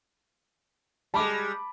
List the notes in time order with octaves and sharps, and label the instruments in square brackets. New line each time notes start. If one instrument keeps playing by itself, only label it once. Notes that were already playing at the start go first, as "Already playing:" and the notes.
[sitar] G3 G#3 [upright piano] A5 B5 D6